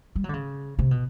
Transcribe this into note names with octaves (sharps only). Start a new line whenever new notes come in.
G3
F#3
D3
C#3
C3
B2